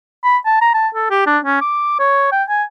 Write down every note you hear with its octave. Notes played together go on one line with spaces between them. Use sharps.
B5
A5
A#5
A5
A4
G4
D4
C#4
D6
C#5
G5
G#5